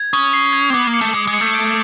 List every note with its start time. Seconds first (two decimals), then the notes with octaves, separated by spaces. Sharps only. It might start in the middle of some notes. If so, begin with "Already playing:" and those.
Already playing: G#6
0.13 C#4 D#6
0.33 C7
0.53 G#6
0.70 C4
0.73 B3 D6
0.87 A#3
0.94 C#7
1.01 A3
1.13 G#3 D6
1.27 G#3
1.34 C#7
1.41 A3
1.55 D7